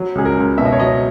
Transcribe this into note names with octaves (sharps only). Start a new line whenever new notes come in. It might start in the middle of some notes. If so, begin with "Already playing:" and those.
Already playing: F#3
C#2 G#4
A#4
C#2
B2 E5
D#5
C#5
F#3 D#5